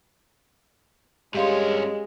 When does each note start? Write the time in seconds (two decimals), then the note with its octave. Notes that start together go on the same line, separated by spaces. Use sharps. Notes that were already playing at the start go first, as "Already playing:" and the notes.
1.34 G2 G#3 C#4 G4 F5 C6